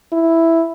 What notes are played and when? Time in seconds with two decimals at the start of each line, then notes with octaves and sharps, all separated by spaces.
0.12 E4